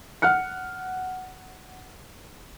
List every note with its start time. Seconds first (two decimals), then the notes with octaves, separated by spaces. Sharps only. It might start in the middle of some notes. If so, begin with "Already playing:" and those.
0.22 F#5 F6 F#6 C#7